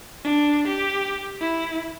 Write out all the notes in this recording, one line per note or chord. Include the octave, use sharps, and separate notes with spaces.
D4
G4
E4